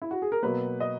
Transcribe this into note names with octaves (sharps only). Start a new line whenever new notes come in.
E4
F#4
G#4
A#4
B2 F#3 A#3 B4
D#5